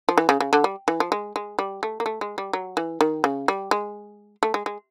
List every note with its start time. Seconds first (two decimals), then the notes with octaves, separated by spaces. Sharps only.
0.09 F3
0.18 E3
0.29 C#3
0.40 C#3
0.53 D3
0.64 G3
0.88 E3
1.00 F3
1.12 G#3
1.36 G#3
1.59 G3
1.83 A3
2.00 A#3
2.06 A3
2.21 G#3
2.38 G3
2.53 F#3
2.77 E3
3.01 D#3
3.24 C#3
3.48 G3
3.71 G#3
4.43 A3
4.54 G#3
4.66 G#3